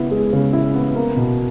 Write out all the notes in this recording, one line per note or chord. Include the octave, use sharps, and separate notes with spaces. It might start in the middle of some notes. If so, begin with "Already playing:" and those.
Already playing: C#3 B3 E4
G#3
C#3
E4
B3
A#3
B2